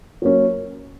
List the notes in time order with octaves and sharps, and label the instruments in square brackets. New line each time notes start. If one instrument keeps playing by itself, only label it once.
[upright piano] F#3 A#3 C#4